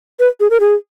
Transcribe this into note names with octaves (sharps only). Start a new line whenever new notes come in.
B4
G#4
A#4
G#4